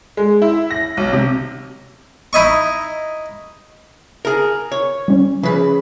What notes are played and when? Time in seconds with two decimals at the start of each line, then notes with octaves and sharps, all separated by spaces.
0.17 G#3
0.42 E4
0.71 A#6
0.97 B1
1.13 C3
2.33 D#4 E4 D#5 C#6
4.25 G#4 A#4
4.72 C#5
5.08 G3 C#4
5.43 C#3 F3 B4